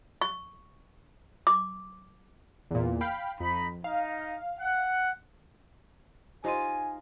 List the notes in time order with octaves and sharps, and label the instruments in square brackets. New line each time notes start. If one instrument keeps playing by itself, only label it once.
[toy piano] C#6
D6
[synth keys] E2 A#2
F5 G5 B5
[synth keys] F2 [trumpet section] D#4 B5
[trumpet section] D#4 [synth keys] F5
[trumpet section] F#5
[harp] D#4 F4 D#7 [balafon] G4 C5 D#5 [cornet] G#5